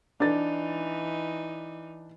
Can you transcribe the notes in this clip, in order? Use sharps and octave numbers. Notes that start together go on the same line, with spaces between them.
E3 D4 D#4 A6